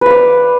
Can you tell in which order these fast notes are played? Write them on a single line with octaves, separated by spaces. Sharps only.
B4 F5 D5